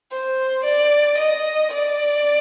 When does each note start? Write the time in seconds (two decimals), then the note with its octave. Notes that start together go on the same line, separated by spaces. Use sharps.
0.11 C5
0.64 D5
1.18 D#5
1.71 D5